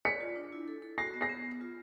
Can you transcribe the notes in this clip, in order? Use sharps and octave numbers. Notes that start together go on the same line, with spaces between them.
D5 B6 C#7
F4
D4
E4
A4
A4
F#4 A#6 C7
B3
A#6 C7
B3
B3
F4